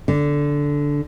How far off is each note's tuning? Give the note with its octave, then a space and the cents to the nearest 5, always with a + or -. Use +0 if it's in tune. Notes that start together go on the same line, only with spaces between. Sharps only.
D3 -10